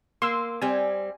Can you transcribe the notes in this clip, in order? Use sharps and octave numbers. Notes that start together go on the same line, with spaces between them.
A#3 C6 E6
G3 C4 G#5